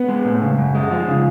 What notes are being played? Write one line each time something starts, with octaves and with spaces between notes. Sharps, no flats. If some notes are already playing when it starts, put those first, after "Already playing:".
Already playing: B3
G#3
A2
C#3
F#2
G#3
F3
C#3